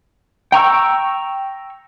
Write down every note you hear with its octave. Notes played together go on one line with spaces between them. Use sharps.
G5 A#5 C#6 E6